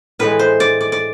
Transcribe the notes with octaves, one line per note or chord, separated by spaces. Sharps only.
A2 E3 G#3 B4
C5
D5
D5
D5